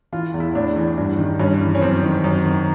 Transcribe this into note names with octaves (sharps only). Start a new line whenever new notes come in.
E3 F4
E2
E4
A2 D4
E3
G2
D#3
G2 C#4
E3
C#4
F#2 C4
D#3
F#2
D#3